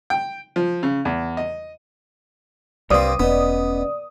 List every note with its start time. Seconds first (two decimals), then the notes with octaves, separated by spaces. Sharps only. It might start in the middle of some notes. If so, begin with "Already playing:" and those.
0.10 G5
0.56 F3
0.83 C#3
1.05 E2
1.37 D#5
2.91 C2 G2 C4 A#4 C5 D5 F5 D#6
3.20 E1 B3 C#4 D#5